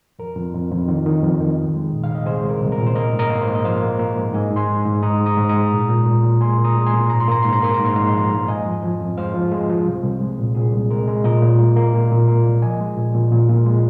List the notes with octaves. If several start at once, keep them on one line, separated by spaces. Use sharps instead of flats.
F2 A#4
F2
F2
F2
D#3
D#3
F2
D#3
C2
G#3
A#2
F5
C2
D#5
C2 G#4 C5
G#3
A#4
C2
A#4
A#2
C5
A#3 A#4 D#5
G#2
A#4 D#5
A#3
C5 F5
G#2
D#5
F3 C5 F5
A#3
A#3
G#2
G#2 D#5 G#5
G#2
G#5 C6
G#2
G#2
G#2 A#5 D#6
G#3
A#5 D#6
G#2
G#3 A#5 D#6
A#2
A#2
A#2
A#2
G#3 G#5 C6
A#2
A#5 D#6
G#3
G#5 C6
A#2
G#2 A#5
C6
A#3 A#5
G#2 C6
A#5
A#3 C6
A#5
G#2
C6
G#2 A#5
C6
F3 F5 A#5
G#2
F2 D#5 G#5
F3
F3
F2
G#3 C5 F5
F3
G#3
F3
C2
C2
G#3
A#2
A#2 G#4
C2
G#3 A#4
G#3
A#2 A#4 D#5
A#2
A#3
A#3
A#2
A#2
A#3
C2
F3 D#5 G#5
G#3
A#2
A#2
A#2
A#2
G#3